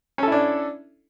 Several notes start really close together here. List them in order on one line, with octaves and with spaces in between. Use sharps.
C#4 A4 E4 D4